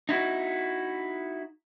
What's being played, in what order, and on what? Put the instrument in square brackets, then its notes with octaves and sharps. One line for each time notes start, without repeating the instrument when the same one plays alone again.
[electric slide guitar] D#4 E4 F#4